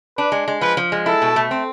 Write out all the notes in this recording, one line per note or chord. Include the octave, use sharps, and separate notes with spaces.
D4 B4
G#3
G#3
F3 B4
F3
G#3
E4 A4
B2
A3
C4